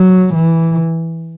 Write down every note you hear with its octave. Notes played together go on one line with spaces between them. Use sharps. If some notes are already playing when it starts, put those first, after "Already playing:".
Already playing: F#3
E3